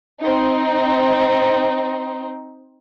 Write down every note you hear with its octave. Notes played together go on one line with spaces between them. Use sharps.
C4 D#4